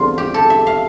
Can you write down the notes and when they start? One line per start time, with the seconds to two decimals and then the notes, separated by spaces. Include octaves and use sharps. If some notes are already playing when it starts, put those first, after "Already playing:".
Already playing: E2 D3 G3 C4 F4
0.18 G4
0.34 A4
0.50 E5
0.67 F5